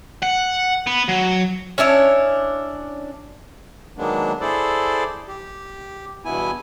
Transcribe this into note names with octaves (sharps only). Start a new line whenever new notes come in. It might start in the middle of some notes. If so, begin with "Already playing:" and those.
F#5
B3
F#3
C#4 D4 E4 C#5
D#3 F#3 G#3 A#3 B3 D4
E4 G#4 A4 C5 D5
G4
E2 G2 B2 B3 E4 G#5